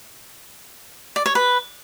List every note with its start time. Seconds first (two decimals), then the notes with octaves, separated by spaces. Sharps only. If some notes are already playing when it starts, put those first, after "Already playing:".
1.16 D5
1.26 C#5
1.35 B4